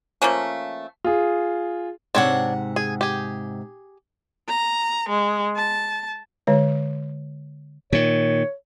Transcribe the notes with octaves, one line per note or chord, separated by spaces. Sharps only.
F3 A3 A#3 C#4
F4 G#4
G#2 C3 C4 D4 C#5 F#5
G#4
G4 G#4
A#5
G#3
A5
D3 G#3 C#5
A#2 D#3 C#5